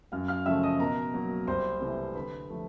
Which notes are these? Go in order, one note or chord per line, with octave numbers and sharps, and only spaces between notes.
F#2 F5 F6
F5 F6
C#3 F3 A3 E5 E6
D#5 D#6
B2 A#4 A#5
F#3 A#3
C2 C5 C6
C3 E3 A3
D3 B4 B5
F3 A3